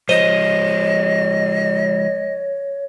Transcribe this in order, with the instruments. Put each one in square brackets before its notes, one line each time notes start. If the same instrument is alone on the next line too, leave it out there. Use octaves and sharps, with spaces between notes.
[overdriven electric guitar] F3 G#3 [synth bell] C5 D#7 G7 [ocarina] C#5 [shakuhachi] D#5